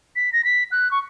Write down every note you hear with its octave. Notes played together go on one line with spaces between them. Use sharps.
B6
A#6
B6
F#6
C#6